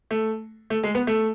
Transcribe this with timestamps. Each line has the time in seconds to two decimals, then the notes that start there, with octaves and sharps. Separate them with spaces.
0.11 A3
0.70 A3
0.84 G#3
0.95 B3
1.07 A3